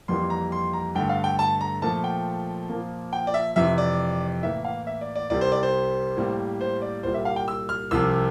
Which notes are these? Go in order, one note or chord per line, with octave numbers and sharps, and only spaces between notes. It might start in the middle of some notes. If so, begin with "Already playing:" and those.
F2 E3 G3 A#3 C6
A#5
C6
A#5
G2 D3 A3 G5
F5
G5
A5
A#5
A#2 F3 A3 A5
G5
A#2 F3 A#3
G5
D5
E5
F2 C3 E3 E5
D5
A2 E3 A#3 E5
F5
E5
D5
D5
C2 C3 G3 D5
C5
D5
C5
A2 G3 A#3
C5
D5
C2 A#2 G3 C5
E5
F5
G5
E6
F6
C2 C3 F3 E6